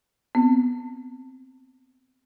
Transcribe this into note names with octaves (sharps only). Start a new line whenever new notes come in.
B3 C4